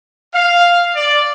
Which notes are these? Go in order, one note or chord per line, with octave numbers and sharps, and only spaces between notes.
F5
D5